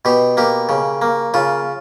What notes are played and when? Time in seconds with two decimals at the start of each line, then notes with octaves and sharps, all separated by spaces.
0.05 B2 G4
0.37 A#3 G4
0.69 C#3
1.02 A#3
1.34 C#3 F4